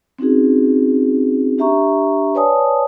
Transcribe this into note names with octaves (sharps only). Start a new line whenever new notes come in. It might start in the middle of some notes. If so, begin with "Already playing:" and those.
C4 C#4 D#4 F#4 G#4
D4 G4 E5 A#5 C#6
B4 C#5 D5 G#5 A5 D#6